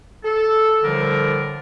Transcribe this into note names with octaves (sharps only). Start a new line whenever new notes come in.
A4
A2 D3 F3 G3 D4 A#4